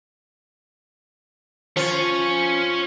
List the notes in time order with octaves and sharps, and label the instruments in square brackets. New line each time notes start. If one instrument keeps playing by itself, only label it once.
[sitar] F3 [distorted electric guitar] C#4 C#5